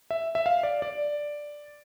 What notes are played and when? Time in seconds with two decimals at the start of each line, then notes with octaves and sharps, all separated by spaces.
0.10 E5
0.35 E5
0.46 F5
0.63 D5
0.82 D5